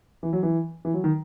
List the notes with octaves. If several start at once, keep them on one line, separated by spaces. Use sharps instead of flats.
E3
F#3
E3
E3
F#3
D#3